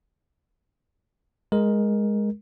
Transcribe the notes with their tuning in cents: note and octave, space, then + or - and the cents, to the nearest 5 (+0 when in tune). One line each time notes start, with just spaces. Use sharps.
G#3 +0 A#4 +10